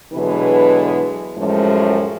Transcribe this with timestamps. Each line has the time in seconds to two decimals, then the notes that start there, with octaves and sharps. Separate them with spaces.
0.13 B2 D3 E3 F#3 G#3 B4
1.37 F#2 A2 F3 G#3